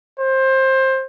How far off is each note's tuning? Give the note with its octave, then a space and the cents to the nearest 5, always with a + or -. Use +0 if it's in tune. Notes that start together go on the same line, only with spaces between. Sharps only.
C5 +20